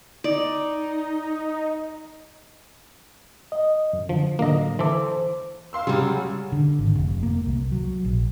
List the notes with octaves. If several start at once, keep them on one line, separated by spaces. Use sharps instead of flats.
D#4 D5
D#5
F#2
D3 F3
A2 D3 F#3 A#3 D#5
E3 A4 C5 D6
F5 C6 E6
C#3 F#3 G3
D3
G#1
F1
A#3
C2
F#3
A#1